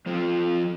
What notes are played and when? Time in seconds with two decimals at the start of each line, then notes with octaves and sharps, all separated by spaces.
0.06 F3 C4 F4 A4